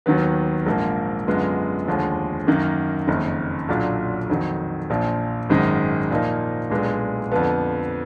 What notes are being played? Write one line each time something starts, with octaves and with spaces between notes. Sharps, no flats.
D#2 D#3 F#3 B3
A#1 G#2 F3 A#3
F#2 D3 G#3 B3 F4
F1 D#2 D3 F3 G#3
F#2 D#3 A#3
F#1 F2 D#3
B1 A#2 F#3 D4 F4
F2 D#3 F#3
A#1 A#2 F3
G#1 F#2 D#3 G#3
A#2 F3 A#3 D#4
B1 A#2 G#3 B3 D4
F2 D3 F3 B3